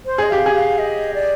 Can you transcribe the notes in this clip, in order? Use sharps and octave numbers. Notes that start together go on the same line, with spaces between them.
C5
G#4 D#5
G4 F5
G#4
F5
D#5
D5